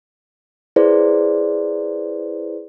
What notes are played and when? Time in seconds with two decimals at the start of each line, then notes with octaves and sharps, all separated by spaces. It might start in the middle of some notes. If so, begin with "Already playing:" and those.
0.76 E4 G#4 B4 C5 D5